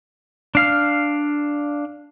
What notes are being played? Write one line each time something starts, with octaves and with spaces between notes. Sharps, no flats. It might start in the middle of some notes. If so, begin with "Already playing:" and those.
D4 F5 F6